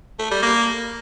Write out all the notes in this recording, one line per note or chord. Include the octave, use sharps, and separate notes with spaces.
A3
G3
A#3